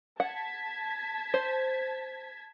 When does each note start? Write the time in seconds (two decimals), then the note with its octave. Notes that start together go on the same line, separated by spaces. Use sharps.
0.20 F#5 A5 G#6 B6
1.34 C5